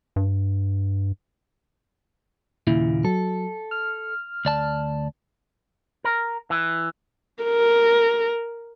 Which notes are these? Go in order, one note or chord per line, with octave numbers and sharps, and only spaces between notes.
G2
D#2 A#2 C#3 E4
F#3 A4
F6
D2 D5 A5
A#4
E3
A#4